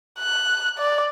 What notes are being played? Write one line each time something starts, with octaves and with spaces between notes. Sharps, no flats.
F#6
D5